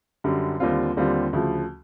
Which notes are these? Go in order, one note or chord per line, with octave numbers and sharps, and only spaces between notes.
F#2 D3 G3
D#2 D3 G3 C4 F4
D#2 D3 G3 C4 F4
D2 C#3 F3